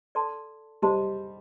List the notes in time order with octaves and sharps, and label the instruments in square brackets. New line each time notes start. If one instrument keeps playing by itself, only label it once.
[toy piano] A4 D5 A5 C6
[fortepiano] G3 [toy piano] C5 D#5 A5 C6